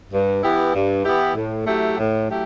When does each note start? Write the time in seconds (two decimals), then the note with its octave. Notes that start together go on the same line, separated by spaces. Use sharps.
0.12 G2
0.43 E3 B3 E4 G4
0.74 G2
1.05 E3 B3 E4 G4
1.35 A2
1.66 F#3 A3 E4 G4
1.98 A2
2.28 F#3 A3 E4 G4